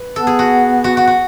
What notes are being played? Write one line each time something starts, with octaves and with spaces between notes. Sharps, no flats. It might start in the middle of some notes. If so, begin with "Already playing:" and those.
Already playing: B4
B3 A4
G#4
F#4
F#4
F#4
F#4